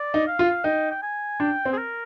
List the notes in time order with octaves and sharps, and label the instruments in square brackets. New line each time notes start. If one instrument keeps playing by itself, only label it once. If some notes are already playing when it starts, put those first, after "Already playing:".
Already playing: [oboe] D5
[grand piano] D#4
[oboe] F5
[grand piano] F4
[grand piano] D#4 [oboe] G5
[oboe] G5
G#5
[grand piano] D4 [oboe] G5
[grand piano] C4
[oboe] G#4
A#4